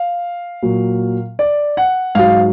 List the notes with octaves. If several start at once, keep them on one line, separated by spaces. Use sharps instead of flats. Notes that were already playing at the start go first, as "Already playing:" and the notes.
Already playing: F5
A#2 F#3
D5
F#5
G#2 F#3 F5